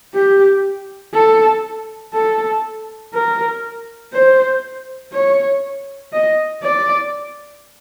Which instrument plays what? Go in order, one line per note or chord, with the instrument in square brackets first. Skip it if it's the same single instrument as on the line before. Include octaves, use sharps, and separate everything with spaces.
[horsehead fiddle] G4
A4
A4
A#4
C5
C#5
D#5
D5